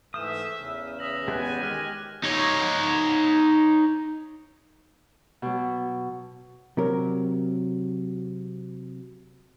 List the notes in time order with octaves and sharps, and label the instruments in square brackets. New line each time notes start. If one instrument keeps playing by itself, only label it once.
[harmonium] G#2 E3 A3 [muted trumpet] E5 [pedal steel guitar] D#6 [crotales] F6 G6 E7
[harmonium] E2 C#3
[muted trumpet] E5 [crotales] D#6 A#6 F#7
[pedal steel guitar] G#3 B3 G4 [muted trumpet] G#5 [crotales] F#6
[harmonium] D#3 G#3 [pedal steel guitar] G4 [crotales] F6 F#6 A#6
[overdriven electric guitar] D#4 C#5
[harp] B2 F#3
[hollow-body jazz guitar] C3 F#3 A#4